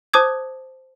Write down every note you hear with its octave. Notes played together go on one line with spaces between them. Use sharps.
C5 A5 D6 D#6 G#6